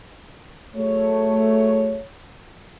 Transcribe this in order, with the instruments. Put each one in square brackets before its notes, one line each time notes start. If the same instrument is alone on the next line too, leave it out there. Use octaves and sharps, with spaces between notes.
[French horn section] F#3 G#4 C#5 [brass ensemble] A3